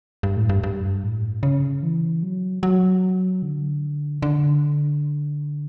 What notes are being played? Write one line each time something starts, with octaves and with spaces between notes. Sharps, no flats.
G2
A2
G2
G2
A2
C#3
E3
F#3
F#3
D3
D3